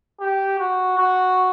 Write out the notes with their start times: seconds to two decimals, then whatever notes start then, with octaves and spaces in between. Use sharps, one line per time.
0.20 G4
0.59 F#4
0.98 F#4